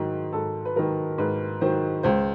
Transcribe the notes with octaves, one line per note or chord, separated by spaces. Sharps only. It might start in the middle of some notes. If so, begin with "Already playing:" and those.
Already playing: G#2 D#3 F#3
G#2 A4
B4
D#3 F#3 A#4
G#2 B4
D#3 F#3 C5
C#2 C5